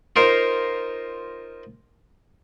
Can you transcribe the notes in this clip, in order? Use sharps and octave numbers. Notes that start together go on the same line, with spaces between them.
D#4 F4 A#4 C5